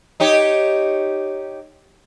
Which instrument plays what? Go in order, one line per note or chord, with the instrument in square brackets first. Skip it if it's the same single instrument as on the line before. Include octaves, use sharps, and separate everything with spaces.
[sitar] D#4 G4 C#5